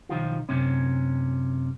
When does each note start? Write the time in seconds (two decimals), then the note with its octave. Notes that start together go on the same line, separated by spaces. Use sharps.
0.09 B1 D#3 F3 F4
0.49 F#2 C3 C#4